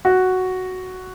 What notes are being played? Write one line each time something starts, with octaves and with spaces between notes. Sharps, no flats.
F#4